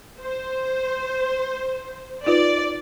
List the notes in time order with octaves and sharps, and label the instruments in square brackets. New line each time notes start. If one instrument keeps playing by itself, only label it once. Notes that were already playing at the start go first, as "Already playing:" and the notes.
[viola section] C5
[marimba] D#4 F4 B4 [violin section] D5